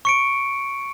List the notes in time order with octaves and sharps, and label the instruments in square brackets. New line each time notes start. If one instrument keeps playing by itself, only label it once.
[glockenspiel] C#6 C#7 D7